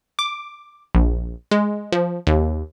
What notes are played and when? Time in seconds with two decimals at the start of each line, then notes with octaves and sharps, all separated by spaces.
0.19 D6
0.95 A#1
1.51 G#3
1.92 F3
2.27 D#2